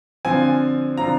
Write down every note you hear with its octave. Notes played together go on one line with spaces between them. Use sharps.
D3 F3 C4 F4 G#5
D3 F3 C4 F4 A#5